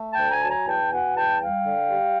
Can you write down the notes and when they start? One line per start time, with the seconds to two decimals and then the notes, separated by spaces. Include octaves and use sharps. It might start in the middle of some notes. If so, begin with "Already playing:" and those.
Already playing: A3
0.12 G5 A5
0.18 D2
0.30 G#5 A#5
0.41 F#3 A5
0.49 G#5 A#5
0.67 E2 G5 A5
0.91 B2 F#5 G#5
1.15 E2 G5 A5
1.40 G3 F5 G5
1.65 D3
1.89 G3